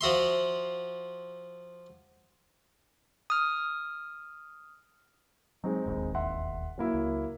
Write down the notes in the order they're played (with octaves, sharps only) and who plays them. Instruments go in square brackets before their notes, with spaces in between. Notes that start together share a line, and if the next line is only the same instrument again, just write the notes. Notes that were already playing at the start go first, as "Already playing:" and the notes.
[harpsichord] F3 F#4 E5 C6
[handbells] D#6 F6
[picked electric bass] F#3 [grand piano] G#3 C4 D#4
[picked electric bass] E1 A1 D#2
[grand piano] E5 F#5 C6
F#3 A#3 E4
[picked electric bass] C#2